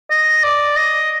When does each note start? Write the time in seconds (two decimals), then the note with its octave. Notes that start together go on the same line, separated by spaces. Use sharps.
0.10 D#5
0.43 D5
0.76 D#5